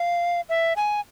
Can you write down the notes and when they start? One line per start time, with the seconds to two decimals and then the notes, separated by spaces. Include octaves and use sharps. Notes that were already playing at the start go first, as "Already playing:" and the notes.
Already playing: F5
0.49 E5
0.76 G#5